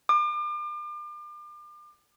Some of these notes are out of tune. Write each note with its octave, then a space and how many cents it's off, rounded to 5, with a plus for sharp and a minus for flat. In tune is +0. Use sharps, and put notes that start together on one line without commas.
D6 +35